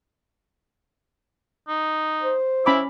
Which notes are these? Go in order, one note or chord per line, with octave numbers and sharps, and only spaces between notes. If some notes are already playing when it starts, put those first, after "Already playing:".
D#4
C5
C#4 E4 B5 D6